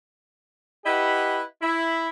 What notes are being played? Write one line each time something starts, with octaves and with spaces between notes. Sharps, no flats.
E4 G4 B4 D#5 F#5
E4